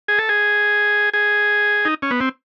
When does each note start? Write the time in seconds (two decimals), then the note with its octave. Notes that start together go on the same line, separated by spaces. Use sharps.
0.08 G#4
0.19 A4
0.29 G#4
1.13 G#4
1.85 D#4
2.02 C#4
2.11 B3
2.21 C4